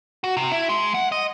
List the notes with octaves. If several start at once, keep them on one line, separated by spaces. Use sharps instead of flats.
F#4
C3
E4
G#3
F#5
D#5